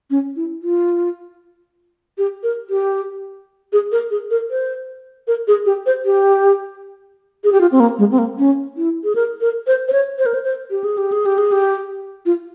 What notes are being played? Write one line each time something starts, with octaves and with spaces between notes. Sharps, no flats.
C#4
E4
F4
G4
A#4
G4
G#4
A#4
G#4
A#4
C5
A#4
G#4
G4
C5
G4
G#4
G4
F4
C4
A#3
G#3
C4
A#3
C#4
E4
G#4
A#4
A#4
C5
C5
C#5
C5
A#4
C5
C5
G4
G#4
G4
G#4
G4
G#4
G4
F4